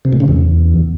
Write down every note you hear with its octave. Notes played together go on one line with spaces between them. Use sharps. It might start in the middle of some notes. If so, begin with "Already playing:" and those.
C3
A2
C#3
E2